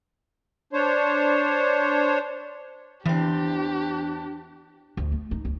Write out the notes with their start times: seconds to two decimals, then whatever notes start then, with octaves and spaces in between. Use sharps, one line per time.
0.73 D4 C5 C#5
3.06 E2 E3 C4 D4 G4
4.97 D2
5.12 A3
5.31 D#4
5.45 D2